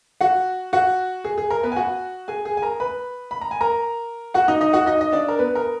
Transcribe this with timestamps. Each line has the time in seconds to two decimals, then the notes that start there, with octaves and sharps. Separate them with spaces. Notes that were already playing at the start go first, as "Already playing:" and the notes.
0.21 F#4 F#5
0.73 F#4 F#5
1.24 G#4
1.38 G#4
1.50 A#4
1.63 B3 B4
1.72 G#5
1.76 F#4 F#5
2.28 G#4 G#5
2.45 G#4 G#5
2.57 G#5
2.62 A#4 A#5
2.80 B4 B5
3.31 B5
3.41 A#5
3.51 G#5
3.61 A#4 A#5
4.34 F#4 F#5
4.48 D#4 D#5
4.61 D#4 D#5
4.73 F#4 F#5
4.86 D#4 D#5
5.01 D#5
5.12 D4 D5
5.28 A#4
5.39 B3 B4
5.55 A#4